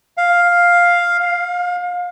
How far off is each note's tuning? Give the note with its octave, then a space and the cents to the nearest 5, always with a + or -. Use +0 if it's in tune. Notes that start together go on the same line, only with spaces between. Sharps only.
F5 +5
F5 +30